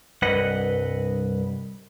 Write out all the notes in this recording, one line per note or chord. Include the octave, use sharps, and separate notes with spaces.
C2 G2 B4 D#5 F#5